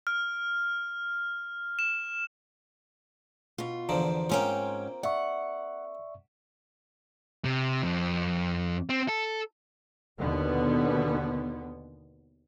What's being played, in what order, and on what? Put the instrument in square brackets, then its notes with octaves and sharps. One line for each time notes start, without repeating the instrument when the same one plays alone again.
[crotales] F6
E7
[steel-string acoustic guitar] B2 F4
[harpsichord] E2 D3 F3 [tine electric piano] C5 A#5
[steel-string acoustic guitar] G#2 C#4 G5 [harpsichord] A#3 C4 F4
[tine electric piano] D5 E5 C#6 [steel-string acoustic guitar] F#5
[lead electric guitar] C3
F2
C4
A4
[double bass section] D#2 B2 D3 B3